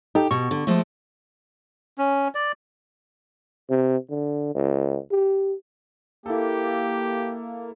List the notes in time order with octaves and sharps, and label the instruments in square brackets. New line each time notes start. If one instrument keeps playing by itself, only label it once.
[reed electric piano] D#4 A4 G5 [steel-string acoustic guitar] G4
[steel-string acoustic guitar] B2 [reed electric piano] C#6
[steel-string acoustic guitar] D3
F3 G#3 A3
[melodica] C#4
D5
[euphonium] C3
D3
C#2
G4
[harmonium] A#3 [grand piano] E4 A4 [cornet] G4